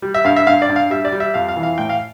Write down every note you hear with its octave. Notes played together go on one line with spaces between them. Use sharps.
G3
E5
G2 F5
E5
G2 F5
D5
G2
F5
G3 E5
D5
G3
E5
F2 F5
F5
E3
F5
A2 G5
F5